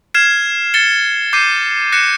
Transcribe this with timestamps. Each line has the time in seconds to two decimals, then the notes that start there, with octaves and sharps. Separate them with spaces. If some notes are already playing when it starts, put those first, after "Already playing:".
0.14 F6 G#6 C7 E7
0.74 A6 C#7 E7 G7
1.33 D6 G6 C7 D#7
1.92 F#6 A#6 C#7 E7